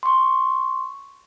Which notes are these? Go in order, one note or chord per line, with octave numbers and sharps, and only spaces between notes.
C6 C#6